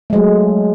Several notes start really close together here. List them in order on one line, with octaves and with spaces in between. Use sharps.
A3 G#3 F#3